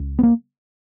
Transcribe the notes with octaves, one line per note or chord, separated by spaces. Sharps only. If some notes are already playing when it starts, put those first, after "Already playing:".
Already playing: C#2
B3
A#3